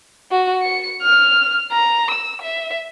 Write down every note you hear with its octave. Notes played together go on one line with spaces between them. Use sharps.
F#4
C#7
F6
A#5
E6
E5